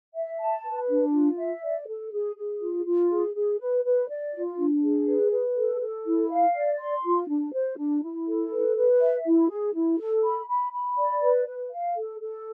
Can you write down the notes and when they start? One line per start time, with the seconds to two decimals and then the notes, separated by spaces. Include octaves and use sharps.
0.15 E5
0.40 A5
0.65 B4
0.89 D4
1.14 F4
1.38 E5
1.63 D5
1.88 A4
2.12 G#4
2.37 G#4
2.61 F4
2.85 F4
3.10 G#4
3.35 G#4
3.59 B4
3.84 B4
4.09 D5
4.33 F4
4.58 D4
4.82 G#4
5.07 B4
5.32 B4
5.56 A4
5.81 A4
6.06 E4
6.30 F5
6.55 D5
6.79 C6
7.03 F4
7.28 D4
7.53 C5
7.77 D4
8.02 E4
8.27 A4
8.51 B4
8.76 B4
9.00 E5
9.25 E4
9.50 G#4
9.74 E4
9.99 A4
10.24 B5
10.48 B5
10.73 B5
10.97 D5
11.22 B4
11.46 B4
11.71 F5
11.95 A4
12.20 A4